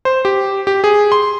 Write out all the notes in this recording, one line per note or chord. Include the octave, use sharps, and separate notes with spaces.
C5
G4
G4
G#4
C6